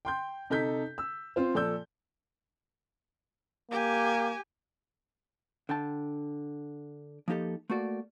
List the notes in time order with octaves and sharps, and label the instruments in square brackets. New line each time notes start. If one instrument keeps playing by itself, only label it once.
[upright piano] G5 C6 G6
C3 D#4 A4 G6 B6
E6
C4 F4 C5
A#2 F3 A4 D5 E6 G6
[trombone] A#3 [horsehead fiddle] G4 G#5
[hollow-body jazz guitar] D3 G5 A5
F3 A#3 D#4 G4 A4
A3 A#3 F#4 D5